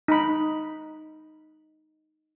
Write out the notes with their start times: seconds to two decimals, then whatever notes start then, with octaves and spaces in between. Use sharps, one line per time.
0.08 D#4 B5